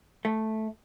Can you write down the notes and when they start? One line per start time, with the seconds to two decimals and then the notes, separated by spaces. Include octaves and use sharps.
0.25 A3